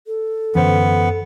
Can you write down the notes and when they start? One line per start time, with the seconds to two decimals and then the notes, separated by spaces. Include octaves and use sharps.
0.07 A4
0.55 F#2 D3 E3 B3 C5